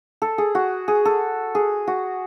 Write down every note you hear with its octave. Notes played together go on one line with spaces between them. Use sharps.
A4
G#4
F#4
G#4
A4
G#4
F#4